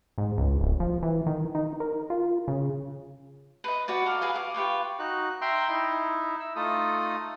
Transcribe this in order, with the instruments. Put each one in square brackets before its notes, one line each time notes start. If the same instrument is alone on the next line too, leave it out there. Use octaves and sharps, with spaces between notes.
[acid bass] G#2
C#2
D1
F3
E3
D#3
D#4
A#4
F4
C#3
[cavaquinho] B4 D#5
F#4 B4 D5
A4 A#4 F5
F#4 G#4 B4 F5
F5 D6
F4 G4 B4 C#6
[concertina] D#4 F#4 F#6
E5 G5 A#5 C6
D#4 E4
E6
A3 D#4 F4 A4 D#6